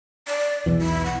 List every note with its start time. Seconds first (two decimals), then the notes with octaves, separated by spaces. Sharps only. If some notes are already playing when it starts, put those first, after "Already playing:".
0.28 D5
0.66 B1 E2 E3
0.82 E4
1.06 F#5